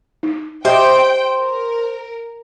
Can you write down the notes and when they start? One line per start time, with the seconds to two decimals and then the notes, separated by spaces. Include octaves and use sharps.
0.23 D#4
0.65 G4 C5 D#5 E5 G5
1.40 A#4